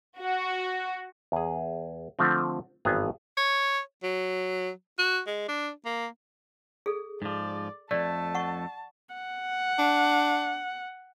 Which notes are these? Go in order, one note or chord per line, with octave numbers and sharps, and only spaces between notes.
F#4
E2 G#4
D3 F3 A3 C4
G#1 G2 E3 B3 G#4 A#5
C#5
F#3
F#4
G#3
D4
A#3
G#4 A4
G#2 F3 D5
F2 G#2 A3 D5 A5
F#5 C#6
F#5
D4